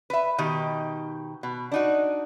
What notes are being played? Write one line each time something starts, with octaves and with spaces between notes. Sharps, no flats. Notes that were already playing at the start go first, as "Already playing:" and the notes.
B4 E5
B2 D#3 D#4 G4
B2
D4 D#4 F#4